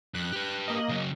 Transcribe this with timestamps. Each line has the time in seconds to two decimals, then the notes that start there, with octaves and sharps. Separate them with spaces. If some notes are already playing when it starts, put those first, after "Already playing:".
0.14 F2 F#6
0.33 G4 B4
0.68 A#3 D#5
0.89 C#3 F#3